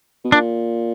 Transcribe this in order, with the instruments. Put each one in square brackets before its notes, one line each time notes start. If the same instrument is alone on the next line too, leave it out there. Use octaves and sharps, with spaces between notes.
[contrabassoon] B2
[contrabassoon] A#2 [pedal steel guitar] D4